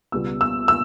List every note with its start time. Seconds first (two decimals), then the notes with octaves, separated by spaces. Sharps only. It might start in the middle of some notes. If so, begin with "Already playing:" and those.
0.12 C#2 B2 G3 B3 E6
0.41 E6
0.68 E6